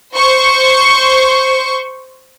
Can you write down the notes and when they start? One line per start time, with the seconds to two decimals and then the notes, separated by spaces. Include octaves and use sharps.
0.15 C5 C#6